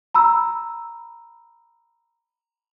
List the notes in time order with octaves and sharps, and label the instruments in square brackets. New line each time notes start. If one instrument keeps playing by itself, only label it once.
[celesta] A#5 B5 E6